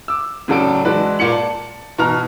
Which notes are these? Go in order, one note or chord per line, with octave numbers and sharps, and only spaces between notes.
D6 E6
A2 C#3 F#3 A4 D5 D7
E3 G#3 F#4 B4 D5 A5
A#2 D5 C#7 F#7
A5
B2 E3 A5 A#5 F6